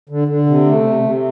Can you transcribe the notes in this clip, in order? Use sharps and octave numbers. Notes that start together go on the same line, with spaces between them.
D3
D3
C3
A3
C3
C3